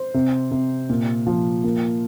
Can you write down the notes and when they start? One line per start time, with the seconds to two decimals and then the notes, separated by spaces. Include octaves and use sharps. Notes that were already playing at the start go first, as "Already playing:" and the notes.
Already playing: C5
0.14 C3
0.51 C3
0.89 A#2
1.27 F3
1.64 A#3